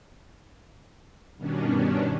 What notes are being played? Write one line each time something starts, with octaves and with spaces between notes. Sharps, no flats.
G2 B2 D#3 C#4 D4